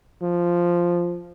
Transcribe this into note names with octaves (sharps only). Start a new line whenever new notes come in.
F3